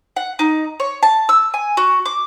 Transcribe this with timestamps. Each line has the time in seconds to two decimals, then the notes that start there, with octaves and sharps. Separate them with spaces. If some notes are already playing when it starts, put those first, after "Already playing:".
0.16 F#5
0.39 D#4
0.80 C#5
1.03 A5
1.29 E6
1.54 G#5
1.77 F#4
2.06 D6